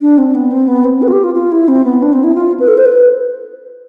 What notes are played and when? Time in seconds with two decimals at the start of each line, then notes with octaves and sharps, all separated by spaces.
0.01 D4
0.18 C4
0.35 B3
0.52 C4
0.68 B3
0.84 C4
1.02 B4
1.08 F4
1.12 G4
1.24 F4
1.34 F4
1.52 E4
1.68 C4
1.85 B3
2.02 D4
2.13 C4
2.24 E4
2.35 F4
2.60 B4
2.68 A4
2.77 C5
2.85 B4